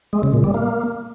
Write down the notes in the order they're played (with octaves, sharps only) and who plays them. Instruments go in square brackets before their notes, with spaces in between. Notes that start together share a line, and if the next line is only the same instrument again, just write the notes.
[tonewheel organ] G#3
C#3
A#2
G3
A#3